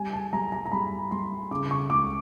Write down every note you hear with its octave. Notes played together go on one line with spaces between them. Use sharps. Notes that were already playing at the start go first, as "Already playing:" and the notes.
Already playing: G3 G#5
A5
G3 A#5
A#5
A#5
G3 B5
G3 C6
C#3 D6
C#6
C#2 D6